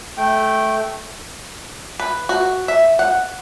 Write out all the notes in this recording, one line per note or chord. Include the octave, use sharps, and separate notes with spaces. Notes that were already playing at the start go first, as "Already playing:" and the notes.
A3 G5
B4
F#4
E5
F#5